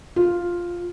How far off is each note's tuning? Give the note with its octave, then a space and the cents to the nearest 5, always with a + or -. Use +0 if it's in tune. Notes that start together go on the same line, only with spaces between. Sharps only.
F4 +0